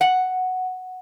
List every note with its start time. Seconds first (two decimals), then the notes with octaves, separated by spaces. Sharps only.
0.01 F#5